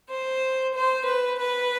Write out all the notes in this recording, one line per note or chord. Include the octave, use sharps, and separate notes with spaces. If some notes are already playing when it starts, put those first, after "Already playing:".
C5
C5
B4
B4